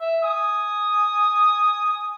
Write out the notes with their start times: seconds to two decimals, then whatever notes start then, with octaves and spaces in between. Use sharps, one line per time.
0.01 E5
0.24 G#5 D#6